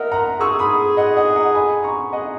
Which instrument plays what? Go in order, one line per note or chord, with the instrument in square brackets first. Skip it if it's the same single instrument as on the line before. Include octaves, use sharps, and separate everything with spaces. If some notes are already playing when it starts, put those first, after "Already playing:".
Already playing: [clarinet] A#4 [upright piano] D#5 E5 F#5
[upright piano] F#5 A#5
[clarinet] G#4 [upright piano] C#6 E6
[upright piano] B5 D#6
D#5 F#5
D#5 F#5
F#5 A#5
G#5 B5
A#5 C#6
[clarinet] G#4 [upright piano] D#5 F#5